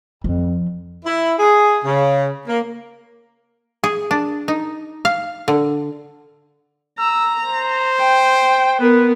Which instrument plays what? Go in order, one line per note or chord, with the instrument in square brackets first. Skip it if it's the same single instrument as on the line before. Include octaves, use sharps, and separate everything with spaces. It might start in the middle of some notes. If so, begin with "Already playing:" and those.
[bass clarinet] F2 [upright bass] F3
[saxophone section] E4
G#4
C#3
A#3
[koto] G#4
D4
D#4
F5
D3
[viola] A#5 [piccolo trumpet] E6
[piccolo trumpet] C5
[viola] G5
[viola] B3 A#4 [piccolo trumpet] B4